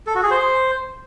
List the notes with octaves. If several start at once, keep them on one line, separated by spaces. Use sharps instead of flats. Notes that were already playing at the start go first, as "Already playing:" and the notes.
A4
F#4
G#4
C5